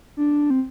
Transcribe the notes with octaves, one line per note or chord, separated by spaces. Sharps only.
D4
C4